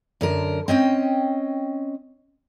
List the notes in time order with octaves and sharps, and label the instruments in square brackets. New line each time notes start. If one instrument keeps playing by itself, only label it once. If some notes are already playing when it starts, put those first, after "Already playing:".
[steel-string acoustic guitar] F#2 D3 A#4
C4 C#4 D#5 G5